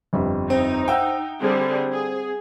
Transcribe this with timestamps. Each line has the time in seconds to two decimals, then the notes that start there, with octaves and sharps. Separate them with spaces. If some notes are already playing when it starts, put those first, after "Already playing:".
0.13 G1 F2 G3
0.50 C4 D#4 C5
0.88 E5 F#5 G5 E6
1.40 D3 G3 C4 G#4
1.92 G#4